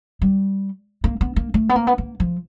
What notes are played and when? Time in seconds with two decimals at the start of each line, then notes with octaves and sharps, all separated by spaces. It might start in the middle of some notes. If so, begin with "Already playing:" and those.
0.22 G3
1.04 A#3
1.21 B3
1.36 A#3
1.54 A3
1.69 B3
1.76 A#3
1.87 B3
1.98 A#3
2.20 F3